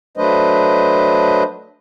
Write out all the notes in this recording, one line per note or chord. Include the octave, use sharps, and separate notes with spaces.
F#3 A3 D4 B4 C5 D#5